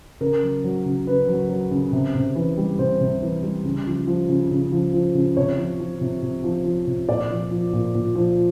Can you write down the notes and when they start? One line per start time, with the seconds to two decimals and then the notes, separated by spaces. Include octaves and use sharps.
0.21 C#3 A#4
0.43 F#3
0.64 F#3
0.86 C#3
1.07 C#3 B4
1.29 F#3
1.49 F#3
1.71 C#3
1.92 C3
2.15 C3
2.35 E3
2.58 G3
2.79 C3 C5
3.01 C3
3.22 E3
3.43 G3
3.65 C#3
3.87 F3
4.07 F3
4.29 C#3
4.51 C#3
4.72 F3
4.94 F3
5.15 C#3
5.37 C3 C#5
5.58 F3
5.80 F3
6.01 C3
6.22 C3
6.44 F3
6.65 F3
6.87 C3
7.09 A#2 D5
7.31 F3
7.51 F3
7.73 A#2
7.95 A#2
8.15 F3